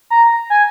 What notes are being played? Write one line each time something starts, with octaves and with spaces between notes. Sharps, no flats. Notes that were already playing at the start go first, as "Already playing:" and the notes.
A#5
G#5